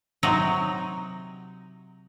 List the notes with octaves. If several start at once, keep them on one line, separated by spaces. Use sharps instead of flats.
C3 F#3 D#4